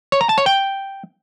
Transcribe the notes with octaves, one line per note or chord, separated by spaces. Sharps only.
C#5
A#5
A5
C#5
G5